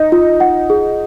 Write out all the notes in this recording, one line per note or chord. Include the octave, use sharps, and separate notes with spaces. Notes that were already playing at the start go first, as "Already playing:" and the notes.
Already playing: D#4 D#5
F4
F#5
G#4